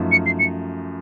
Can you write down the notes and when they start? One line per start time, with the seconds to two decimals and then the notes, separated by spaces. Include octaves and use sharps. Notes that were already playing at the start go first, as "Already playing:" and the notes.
Already playing: F#2 F3 A3 D#4
0.12 C#7
0.26 C7
0.39 C#7